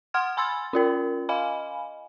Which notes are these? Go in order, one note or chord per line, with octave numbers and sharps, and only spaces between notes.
F#5 C6 F6 G#6
G#5 B5 C6 E6 A6
C#4 F4 A#4
D#5 F5 G#5 B5